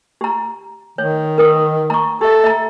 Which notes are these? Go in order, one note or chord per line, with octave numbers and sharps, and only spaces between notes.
G4 A#5
D#3 C#5
A#4 B4 D#6
A#5 C#6
G4 A4 E5
E5 A#5